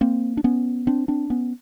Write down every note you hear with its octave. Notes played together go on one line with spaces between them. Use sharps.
A#3 C4
D4
B3 C#4
C4 D4
C4 D4
B3 C#4